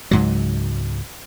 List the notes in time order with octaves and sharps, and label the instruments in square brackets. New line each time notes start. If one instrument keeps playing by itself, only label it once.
[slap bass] C#2 G#2 F#3